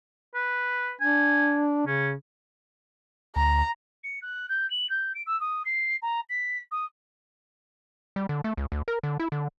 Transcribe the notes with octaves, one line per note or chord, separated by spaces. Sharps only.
B4
D4 G#5
C#3 C#4
D2 A#5
C#7
F#6
G6
F#7
G6
D7
E6
D#6
C7
A#5
B6
D#6
G3
D3
A3
C#2
D2
A#4
D3
E4
D3